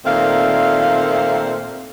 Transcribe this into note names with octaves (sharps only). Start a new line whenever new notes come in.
A#2 D#3 A3 A#3 C4 F5